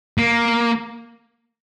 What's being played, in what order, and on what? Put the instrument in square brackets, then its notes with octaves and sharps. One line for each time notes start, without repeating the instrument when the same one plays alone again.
[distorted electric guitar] A#3